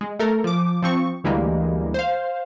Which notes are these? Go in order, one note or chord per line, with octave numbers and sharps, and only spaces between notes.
G#3
A3 A4 A#4
F3 D6
F3 C4 C#6
D2 E3 G3 G#3 A#3
C5 F5